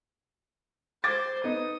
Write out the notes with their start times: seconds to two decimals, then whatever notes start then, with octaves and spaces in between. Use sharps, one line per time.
1.04 C5 D6 G#6 A6
1.44 B3 D#4 D#6